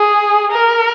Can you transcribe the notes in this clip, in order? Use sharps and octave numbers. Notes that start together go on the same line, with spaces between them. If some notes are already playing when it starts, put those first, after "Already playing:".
Already playing: G#4
A#4